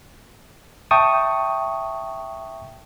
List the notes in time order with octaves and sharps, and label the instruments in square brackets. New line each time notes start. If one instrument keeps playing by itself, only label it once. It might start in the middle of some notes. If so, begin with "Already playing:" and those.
[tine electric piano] E5 G5 A5 C#6 D#6